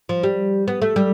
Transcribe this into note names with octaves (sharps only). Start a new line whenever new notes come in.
F3
G3
B3
A3
G3